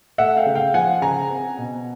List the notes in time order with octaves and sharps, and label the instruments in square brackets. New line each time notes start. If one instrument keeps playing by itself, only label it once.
[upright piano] A3 E5 F#5
F5 G5
C#3
F5 G5
F3 F#5 G#5
C#3 G#5 A#5
C4
B2